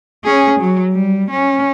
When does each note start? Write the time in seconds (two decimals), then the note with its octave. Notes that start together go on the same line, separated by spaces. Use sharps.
0.24 C#4 G#4
0.60 F#3
0.93 G3
1.31 C#4